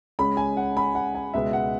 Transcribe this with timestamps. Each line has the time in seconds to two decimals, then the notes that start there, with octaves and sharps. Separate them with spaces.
0.19 C#2 C#3 G#3 C#4 B5
0.37 G#5
0.57 F#5
0.77 B5
0.95 F#5
1.15 G#5
1.34 C#2 B2 G#3 B3 E5
1.53 F#5